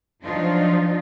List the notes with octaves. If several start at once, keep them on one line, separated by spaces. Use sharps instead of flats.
F3 F#3 D4 D#4 F4